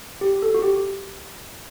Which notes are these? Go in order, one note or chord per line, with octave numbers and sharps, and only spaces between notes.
G4
A4
F#4
G4